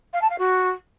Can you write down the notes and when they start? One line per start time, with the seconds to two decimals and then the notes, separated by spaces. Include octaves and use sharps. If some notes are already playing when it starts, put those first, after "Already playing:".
0.13 F5
0.22 A5
0.30 F5
0.39 F#4